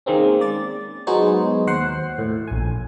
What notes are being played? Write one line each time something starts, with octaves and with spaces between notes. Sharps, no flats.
D#3 G#3 A#3 C4 C#4
D5 A6
F#3 G#3 B3 D#4 C5 C#5
D#2 C5 F#5 C7
A2
A#1 G#5